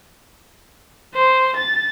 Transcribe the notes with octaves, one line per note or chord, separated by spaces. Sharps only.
C5
A6